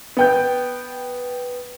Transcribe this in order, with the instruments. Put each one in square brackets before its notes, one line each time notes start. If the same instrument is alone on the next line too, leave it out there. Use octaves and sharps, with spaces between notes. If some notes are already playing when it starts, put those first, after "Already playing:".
[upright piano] B3 G5 G6